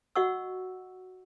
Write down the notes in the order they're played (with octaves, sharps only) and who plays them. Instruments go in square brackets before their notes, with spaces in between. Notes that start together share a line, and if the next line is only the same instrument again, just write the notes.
[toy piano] F#4 D#5 F#5 C#6 E6